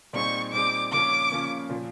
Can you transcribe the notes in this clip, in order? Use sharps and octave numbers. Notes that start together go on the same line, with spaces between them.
A#2 G3 C4 D#4 G#4 C#6
A#2 G3 C4 D#4 G#4 D6
C#3 F3 A#3 C#4 D6
C#3 F3 A#3 C#4
A#2 F3